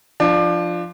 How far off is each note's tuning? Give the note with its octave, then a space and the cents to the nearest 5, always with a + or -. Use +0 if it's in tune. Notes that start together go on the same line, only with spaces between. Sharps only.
F3 +0 D4 +25